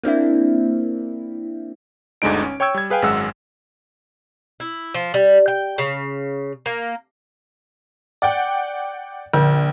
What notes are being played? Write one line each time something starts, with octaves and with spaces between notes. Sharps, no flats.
A#3 C4 D4 E4
G1 D2 D3 G#3 D#4 D7
C#4
C#5 G5 C#6 E6 G#6
G3 G#6
G#4 B4 F5 G5 G#5
G#1 F#2 G#3 F#5 E6
E4
F3
G3
G5
C#3
A#3
D5 F#5 G5
A#1 D3